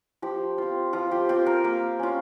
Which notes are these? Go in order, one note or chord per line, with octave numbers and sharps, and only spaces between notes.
F3 G4
C4 F4
F3 F4
G4
C4 F4 G4
A#4
A#3
C#4 F4